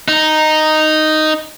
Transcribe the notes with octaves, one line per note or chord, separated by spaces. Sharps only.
D#4